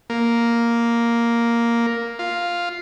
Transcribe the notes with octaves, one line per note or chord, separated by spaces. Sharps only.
A#3
F4